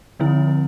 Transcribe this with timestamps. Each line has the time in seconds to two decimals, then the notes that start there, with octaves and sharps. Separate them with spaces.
0.20 D3 F3 C4 E4